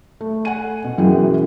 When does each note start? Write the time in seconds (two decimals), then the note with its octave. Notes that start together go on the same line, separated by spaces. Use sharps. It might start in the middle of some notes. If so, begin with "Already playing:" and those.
0.21 A3
0.45 F#5 G#5 D#7
0.84 B2
0.98 F#2 E3 F#3 F#4 G#4 G5